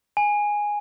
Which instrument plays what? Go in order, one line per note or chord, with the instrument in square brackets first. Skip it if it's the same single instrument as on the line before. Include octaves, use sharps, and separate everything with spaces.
[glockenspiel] G#5